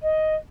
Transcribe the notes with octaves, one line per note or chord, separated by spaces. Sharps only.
D#5